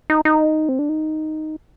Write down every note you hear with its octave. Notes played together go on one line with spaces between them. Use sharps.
D#4
D#4
C4
D4
D#4